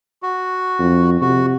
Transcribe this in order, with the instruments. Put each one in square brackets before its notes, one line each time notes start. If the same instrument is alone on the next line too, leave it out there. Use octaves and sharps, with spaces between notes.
[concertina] F#4
[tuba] F2
[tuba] C3 [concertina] F#4